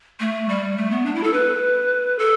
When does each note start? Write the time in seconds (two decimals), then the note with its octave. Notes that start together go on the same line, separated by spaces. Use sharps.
0.20 A3
0.49 G3
0.77 A3
0.91 B3
1.06 D4
1.15 E4
1.23 A4
1.33 B4
2.19 A4